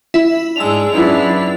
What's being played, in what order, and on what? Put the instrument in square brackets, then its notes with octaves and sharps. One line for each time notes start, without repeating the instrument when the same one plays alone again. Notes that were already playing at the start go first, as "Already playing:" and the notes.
[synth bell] E4 E5
[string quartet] G#2 G#3 D4 [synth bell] E6 F7
[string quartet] F#2 B3 [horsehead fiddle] D4 E4